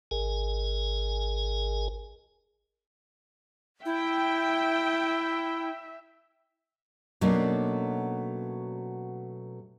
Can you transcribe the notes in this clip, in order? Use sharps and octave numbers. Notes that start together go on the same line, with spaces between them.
G#1 G#4 A#4 G#5
E4 E5 G5
B2 F#3 A3 A#3 C#4 D4